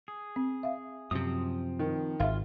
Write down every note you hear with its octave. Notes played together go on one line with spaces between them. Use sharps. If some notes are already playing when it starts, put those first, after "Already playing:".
G#4
C4
E5 F5
F#2 C3 F3 C4 D#6
D#3
G#1 F4 E5 F5